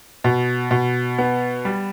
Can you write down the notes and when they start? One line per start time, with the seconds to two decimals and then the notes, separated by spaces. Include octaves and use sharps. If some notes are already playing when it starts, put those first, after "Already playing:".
0.24 B2
0.71 B2
1.19 B3
1.65 G3